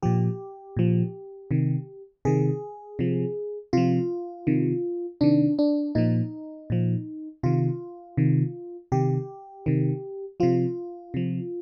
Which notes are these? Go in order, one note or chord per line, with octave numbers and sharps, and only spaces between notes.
A#2 F3 G4
A#2 F3
C3 D#3
C3 D#3 G#4
C3 F3
C3 F3 F4
C3 D#3
C3 D#3 D4
D4
A#2 F3 D#4
A#2 F3
C3 D#3 F4
C3 D#3
C3 D#3 G4
C3 D#3
C3 F3 F4
C3 F3